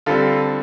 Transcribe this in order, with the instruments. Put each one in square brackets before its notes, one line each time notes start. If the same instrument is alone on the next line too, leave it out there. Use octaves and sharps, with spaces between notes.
[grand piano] D3 G3 C4 F4 A4